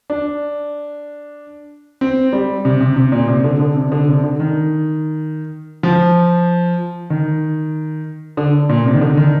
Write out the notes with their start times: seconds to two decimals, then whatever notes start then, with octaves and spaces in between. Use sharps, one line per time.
0.10 D4
2.01 C4
2.33 G3
2.65 C3
2.80 C3
2.96 C3
3.12 A#2
3.28 C3
3.38 C3
3.44 D3
3.60 D3
3.76 C3
3.92 D3
4.08 C3
4.23 D3
4.40 D#3
5.83 F3
7.10 D#3
8.37 D3
8.69 A#2
8.86 C3
8.94 D#3
9.01 D3
9.17 D#3